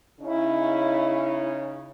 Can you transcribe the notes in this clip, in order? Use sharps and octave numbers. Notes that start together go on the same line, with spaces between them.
C#3 C#4 D#4 E4